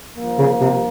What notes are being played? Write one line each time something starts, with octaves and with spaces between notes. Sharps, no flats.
G2 F3 A#3
C#3
C3